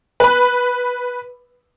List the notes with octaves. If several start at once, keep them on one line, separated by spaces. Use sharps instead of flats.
B4 B5